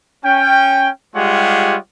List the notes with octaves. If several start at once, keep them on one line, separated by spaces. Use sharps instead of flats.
C#4 G5
G3 G#3 F4 G4 C#5 F#5